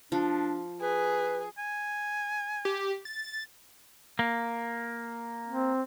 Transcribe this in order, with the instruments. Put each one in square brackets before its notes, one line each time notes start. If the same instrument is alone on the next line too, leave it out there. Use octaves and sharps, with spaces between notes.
[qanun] F3 [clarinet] D4
[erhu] G#4 [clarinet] B4
[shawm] G#5
[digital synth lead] G4
A6
[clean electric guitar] A#3
[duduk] C4